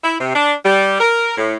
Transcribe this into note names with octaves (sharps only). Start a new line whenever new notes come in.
E4
C3
D4
G3
A#4
A2